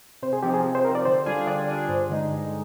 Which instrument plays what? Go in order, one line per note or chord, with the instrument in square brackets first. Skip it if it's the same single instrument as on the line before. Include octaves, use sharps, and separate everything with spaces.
[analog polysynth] C3 [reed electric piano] C5
[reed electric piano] G#4
[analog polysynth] F3 C4 D#4 [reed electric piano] G4
[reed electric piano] G#4
[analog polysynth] C3
[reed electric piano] C5
[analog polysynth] F3 C4 D#4 [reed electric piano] A#4
[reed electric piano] D5
[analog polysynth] D3 [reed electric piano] C5
[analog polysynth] G3 D4 F4 G#4
[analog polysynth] D3 [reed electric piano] D5
[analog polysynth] G3 D4 F4 G#4
[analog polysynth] G2 [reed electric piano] C5
[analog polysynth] D3 G#3 D#4
G2